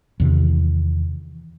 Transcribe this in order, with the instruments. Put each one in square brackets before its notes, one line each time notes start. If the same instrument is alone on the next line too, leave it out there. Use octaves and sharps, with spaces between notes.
[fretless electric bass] E2 C3 D#3